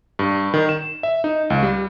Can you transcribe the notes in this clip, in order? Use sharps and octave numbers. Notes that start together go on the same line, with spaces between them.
G2
D#3
E7
E5
D#4
C#2
G3